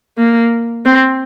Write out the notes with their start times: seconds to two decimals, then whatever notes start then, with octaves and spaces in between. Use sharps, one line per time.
0.18 A#3
0.85 C4